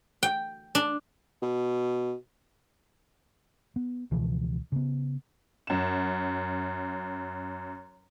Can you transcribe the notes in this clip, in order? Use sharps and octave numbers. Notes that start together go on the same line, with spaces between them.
G5
D4
B2
B3
C#2 B2 E3 F3
C#3 B3
F#2 E7